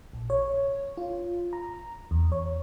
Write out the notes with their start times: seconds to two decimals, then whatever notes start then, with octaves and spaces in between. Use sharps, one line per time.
0.13 A#1
0.30 C#5
0.97 F4
1.53 A#5
2.11 E2
2.32 C#5